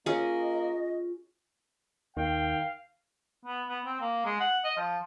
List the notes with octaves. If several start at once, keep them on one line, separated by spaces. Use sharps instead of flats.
A#3 C#4 F4 G#4 D#5
D#2 D#3 F5 G5
B3
B3
C4
A#3
G#3
F#5
D#5
F3